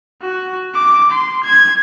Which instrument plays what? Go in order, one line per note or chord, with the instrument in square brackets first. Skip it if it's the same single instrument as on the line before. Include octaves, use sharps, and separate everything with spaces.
[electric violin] F#4
D6
C6
G#6